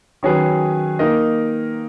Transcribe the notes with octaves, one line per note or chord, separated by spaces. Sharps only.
D#3 F#3 C#4 G#4 B4
A#3 D#4 A#4 D#5